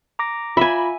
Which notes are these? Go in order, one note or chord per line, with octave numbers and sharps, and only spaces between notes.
A#5 D6 A#6
F4 E5 G#5 B5